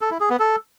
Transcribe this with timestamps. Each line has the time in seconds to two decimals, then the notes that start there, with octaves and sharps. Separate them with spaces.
0.01 A4
0.11 E4
0.20 G#4
0.30 B3
0.40 A4